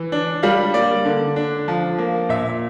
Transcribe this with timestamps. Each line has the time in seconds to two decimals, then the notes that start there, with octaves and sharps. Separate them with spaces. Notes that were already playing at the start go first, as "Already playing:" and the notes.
Already playing: E3
0.12 D4
0.43 G3 F5
0.74 A#3 D5
1.05 D3
1.36 D4
1.68 F3
1.98 A#3
2.29 A#2 E5